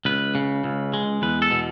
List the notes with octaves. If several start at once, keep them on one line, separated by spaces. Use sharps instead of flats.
C#2 B4
C#3
C#2
G#3
E2 B4
A4
B2